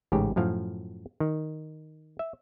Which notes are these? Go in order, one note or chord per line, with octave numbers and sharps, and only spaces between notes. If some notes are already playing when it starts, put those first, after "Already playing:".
A1 G#2 C#3 G4
F#2 A2 F3 F5
D#3
E5